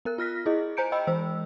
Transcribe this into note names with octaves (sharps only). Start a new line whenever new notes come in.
B3 A#4 F#6
F4 F6 A#6 B6
E4 G#4 D#5
C5 G#5 A#5 G6 C#7 D7
D#5 G5 B5 E6
E3 G#3 C5 E6